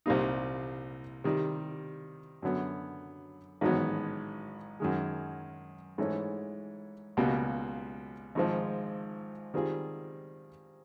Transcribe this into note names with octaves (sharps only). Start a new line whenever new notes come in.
C2 A#2 G3 A#3 D#4
C3 D#3 G3
F#2 D3 F#3 B3
A1 G#2 D#3 F#3 B3
F#2 D#3 G#3
G#2 E3 A3 C#4
C#2 B2 G3 A#3
G#1 G#2 F3
D#3 G3 C4 F4 G#4